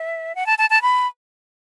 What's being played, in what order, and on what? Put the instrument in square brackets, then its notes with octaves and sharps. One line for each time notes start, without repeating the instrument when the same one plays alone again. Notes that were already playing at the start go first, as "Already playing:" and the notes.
Already playing: [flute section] E5
F#5
A5
A5
A5
B5